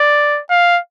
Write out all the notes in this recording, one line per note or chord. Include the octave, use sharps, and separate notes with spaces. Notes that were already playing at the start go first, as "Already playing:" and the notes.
Already playing: D5
F5